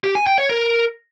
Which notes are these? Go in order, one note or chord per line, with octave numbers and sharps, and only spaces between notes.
G4
G#5
G5
C#5
A#4